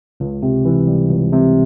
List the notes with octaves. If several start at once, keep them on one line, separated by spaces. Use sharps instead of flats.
C#2
C3
E3
G3
C#2
C3